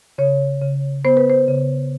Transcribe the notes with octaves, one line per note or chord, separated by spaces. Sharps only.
C#3 C#5
C#3
B3 C5
B4
C5
C#3